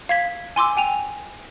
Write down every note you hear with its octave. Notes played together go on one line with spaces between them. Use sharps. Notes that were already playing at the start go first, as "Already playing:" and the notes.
F5 G#6 B6
G#5 C6 D6 E6
G5 G#5 F7